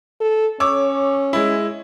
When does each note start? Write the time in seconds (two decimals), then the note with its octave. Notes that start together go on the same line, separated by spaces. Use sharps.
0.21 A4
0.60 C#4 C#5 D6 E6
1.33 G#3 E4